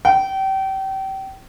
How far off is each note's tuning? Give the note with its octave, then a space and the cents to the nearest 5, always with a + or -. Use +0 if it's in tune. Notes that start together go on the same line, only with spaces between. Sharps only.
G5 -30